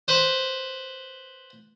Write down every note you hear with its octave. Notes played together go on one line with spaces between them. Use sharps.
B4 C5